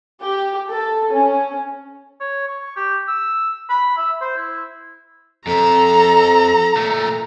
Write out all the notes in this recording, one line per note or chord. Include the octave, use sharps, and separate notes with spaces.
G4
A4
C#4
C#5
C#6
G4
E6
B5
E5
C5
E4
F2 A4 A#5
A#2 A3